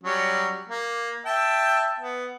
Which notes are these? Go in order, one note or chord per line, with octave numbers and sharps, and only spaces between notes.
F#3 G3 C#4
A#3
E5 G5 A5
B3